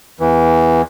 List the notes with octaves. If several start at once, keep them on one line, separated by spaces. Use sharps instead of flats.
E2 E3